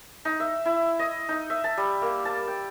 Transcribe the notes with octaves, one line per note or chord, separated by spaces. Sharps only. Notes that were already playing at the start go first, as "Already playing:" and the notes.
D#4
E5
E4
D#5
D#4
E5
A5
G3
A#3
A5
G5